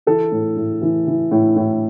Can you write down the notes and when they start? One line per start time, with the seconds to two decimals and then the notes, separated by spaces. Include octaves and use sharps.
0.07 E3 A4
0.32 A2
0.57 A2
0.82 E3
1.07 E3
1.31 A2
1.56 A2